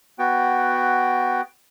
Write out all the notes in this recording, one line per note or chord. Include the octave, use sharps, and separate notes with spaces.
B3 F#4 G5